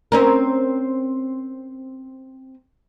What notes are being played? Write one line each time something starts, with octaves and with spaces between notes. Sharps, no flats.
C4 C#4 A#4